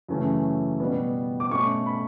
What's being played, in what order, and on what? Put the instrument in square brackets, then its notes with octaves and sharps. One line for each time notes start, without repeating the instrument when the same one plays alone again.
[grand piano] F#2 C#3 E3 A3 C#4
B2 G3 B3
D6
B2 A3 C#4 C#6
B5